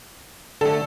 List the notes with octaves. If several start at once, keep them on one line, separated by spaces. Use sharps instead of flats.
D3 A3 A4